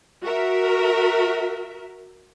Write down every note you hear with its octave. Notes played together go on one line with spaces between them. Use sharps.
F#4 A#4 E5